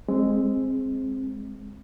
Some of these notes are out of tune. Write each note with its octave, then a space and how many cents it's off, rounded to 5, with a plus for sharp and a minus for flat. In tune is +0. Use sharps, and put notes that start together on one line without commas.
G#3 -5 C4 +10